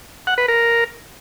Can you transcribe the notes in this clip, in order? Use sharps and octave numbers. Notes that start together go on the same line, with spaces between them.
F#5
B4
A#4